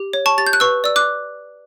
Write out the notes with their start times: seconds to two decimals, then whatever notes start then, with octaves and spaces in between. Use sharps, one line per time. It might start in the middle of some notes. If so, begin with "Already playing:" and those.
Already playing: G4
0.13 C#5
0.26 A5 C#6
0.38 G4 A6
0.47 G6
0.53 F#6
0.60 B4 C#6 E6
0.84 D5 E6
0.96 D6 F#6